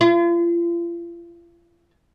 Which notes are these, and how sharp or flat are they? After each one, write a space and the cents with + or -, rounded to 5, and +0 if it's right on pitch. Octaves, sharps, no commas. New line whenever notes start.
F4 -40